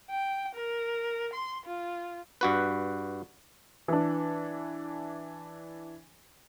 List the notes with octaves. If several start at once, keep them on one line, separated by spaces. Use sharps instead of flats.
G5
A#4
C6
F4
G2 F#4 B4
E3 D4